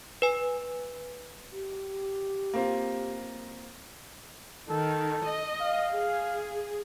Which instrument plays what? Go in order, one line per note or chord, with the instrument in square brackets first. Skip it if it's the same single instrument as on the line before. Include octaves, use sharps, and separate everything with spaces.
[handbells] B4 G#5
[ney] G4
[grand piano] A#3 C4 F4
[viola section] D#3 [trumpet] A4
[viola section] D#5
[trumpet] F5
[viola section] G#4